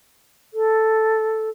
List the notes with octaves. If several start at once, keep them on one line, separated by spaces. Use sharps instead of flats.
A4